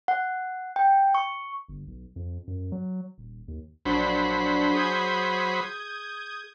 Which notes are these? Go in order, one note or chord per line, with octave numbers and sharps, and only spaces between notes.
F#5
G5
C#6
G1
B1
F2
F#2
F#3
D#1
D#2
A#1 F#3 D4 C5 B5
G#4 D#6 G6 G#6